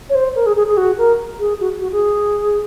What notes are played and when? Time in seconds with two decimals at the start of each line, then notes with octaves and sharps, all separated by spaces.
0.09 C#5
0.14 C5
0.35 A#4
0.46 G#4
0.56 G#4
0.67 G#4
0.77 F#4
0.97 A#4
1.38 G#4
1.60 F#4
1.80 F#4
1.92 G#4